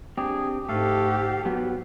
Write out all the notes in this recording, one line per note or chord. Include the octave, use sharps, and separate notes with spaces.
C4 D4 G4 G#4
G#2 A3 G4 A4 F5
F#3 B3